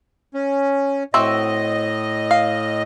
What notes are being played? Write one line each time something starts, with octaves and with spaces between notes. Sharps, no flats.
C#4
A2 C4 F#4 D#5 E5
F5